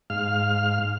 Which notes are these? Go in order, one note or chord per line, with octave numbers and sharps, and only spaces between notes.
G#2 F5 F6